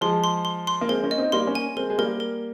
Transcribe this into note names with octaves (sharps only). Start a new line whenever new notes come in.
F3 G#3 C6
C6
C6
C6
A#3
G#3 C4 A#4
A#3 C#4
D#5
C4 D#4
G3 A#3 C6
A#3 C#4
G#5
G#3 C4 A#4
G#3
G3 A#3 A#4
A#4